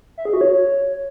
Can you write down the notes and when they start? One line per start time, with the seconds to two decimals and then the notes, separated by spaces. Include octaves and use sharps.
0.18 E5
0.25 G#4
0.33 F#4
0.41 C#5